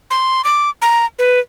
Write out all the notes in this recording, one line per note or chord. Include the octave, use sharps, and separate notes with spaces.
C6
D6
A#5
B4